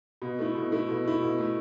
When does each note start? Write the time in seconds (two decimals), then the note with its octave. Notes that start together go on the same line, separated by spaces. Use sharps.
0.22 B2
0.39 A3 E4
0.55 B2
0.72 A3 E4
0.88 B2
1.05 A3 E4
1.21 B2
1.38 A3 E4